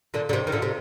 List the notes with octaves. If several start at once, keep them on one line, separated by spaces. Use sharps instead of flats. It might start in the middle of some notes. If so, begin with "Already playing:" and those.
A#2 D3
D3
C3 D#3
D#3
A#2 D3
C3